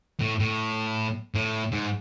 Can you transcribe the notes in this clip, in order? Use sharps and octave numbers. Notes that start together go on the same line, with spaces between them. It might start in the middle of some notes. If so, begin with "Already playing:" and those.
A2
A2
A2
G#2